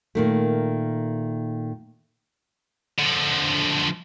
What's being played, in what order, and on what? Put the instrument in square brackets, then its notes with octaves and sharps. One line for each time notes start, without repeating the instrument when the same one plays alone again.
[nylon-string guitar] A#2 D#3 A3
[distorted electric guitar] D3 F3